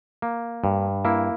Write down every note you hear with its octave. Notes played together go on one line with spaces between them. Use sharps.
A#3
G2
A#3 E4